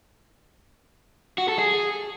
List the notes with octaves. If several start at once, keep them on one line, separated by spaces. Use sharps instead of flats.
F#4
A4
G#4